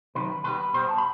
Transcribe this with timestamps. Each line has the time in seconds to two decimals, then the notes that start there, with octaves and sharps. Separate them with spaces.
0.15 C3 D#3 F#3 B4
0.44 B2 G3 B3 B4
0.74 B2 G3 B3 C5
0.89 A5
0.98 B5